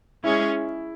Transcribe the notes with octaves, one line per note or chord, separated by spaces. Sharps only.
G#3 C#4 E4 G#4